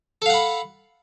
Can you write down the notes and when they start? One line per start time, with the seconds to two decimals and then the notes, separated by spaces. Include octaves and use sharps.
0.22 A4
0.26 F5
0.30 F#5
0.34 B5